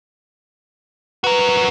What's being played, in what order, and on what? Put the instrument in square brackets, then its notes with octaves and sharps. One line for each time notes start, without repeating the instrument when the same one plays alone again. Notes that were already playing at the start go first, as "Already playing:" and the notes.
[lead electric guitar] F#4 A#4 [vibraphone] B4